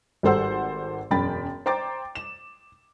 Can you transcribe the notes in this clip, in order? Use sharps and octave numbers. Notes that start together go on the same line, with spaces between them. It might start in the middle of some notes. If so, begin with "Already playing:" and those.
G#1 G3 A4 C5 F#5 E6
E1 F#2 G5 B5 A6
C5 G5 A#5 D6 A6
E7